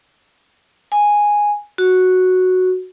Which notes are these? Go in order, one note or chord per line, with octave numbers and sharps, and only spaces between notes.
G#5
F#4